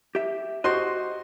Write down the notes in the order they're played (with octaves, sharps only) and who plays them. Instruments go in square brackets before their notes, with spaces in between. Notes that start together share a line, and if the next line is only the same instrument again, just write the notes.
[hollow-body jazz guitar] G4 E5
[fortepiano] F#4 C6 [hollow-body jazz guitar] G4 C5 D#5